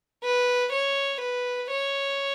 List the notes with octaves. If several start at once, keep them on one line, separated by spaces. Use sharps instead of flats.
B4
C#5
B4
C#5